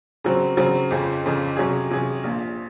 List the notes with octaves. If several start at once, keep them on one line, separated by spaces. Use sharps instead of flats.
C#3 F#3 C4
C#3 F#3 C4
F2 C#3 F3
F2 C#3 F3
C3 F#3 C#4 G#4
C3 F#3 C#4 G#4
A#1 A#2 F3